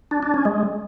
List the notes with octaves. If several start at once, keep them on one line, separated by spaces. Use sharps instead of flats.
D4
D4
C#4
G#3